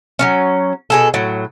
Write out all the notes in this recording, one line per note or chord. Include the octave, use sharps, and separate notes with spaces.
F#3 B3 C#4
B2 G#4 A4
A2 F#3